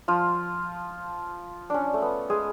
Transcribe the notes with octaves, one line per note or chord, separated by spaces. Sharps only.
F3 F4
C#4 D4
A3
B3
G#3 G#4